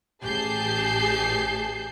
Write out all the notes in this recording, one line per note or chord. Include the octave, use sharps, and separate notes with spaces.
A1 G4 G#4 A5 G6 C7